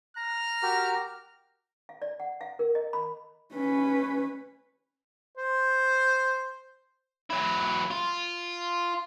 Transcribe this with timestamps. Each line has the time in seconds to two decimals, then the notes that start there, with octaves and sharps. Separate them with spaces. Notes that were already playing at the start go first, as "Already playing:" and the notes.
0.17 A#5 F6
0.63 F#4 G4 A#4
1.89 F5
2.02 D5
2.20 F#5
2.41 F5
2.59 A#4
2.75 D#5
2.93 B5
3.54 C#4 B4
5.38 C5
7.30 F#3 E4
7.91 F4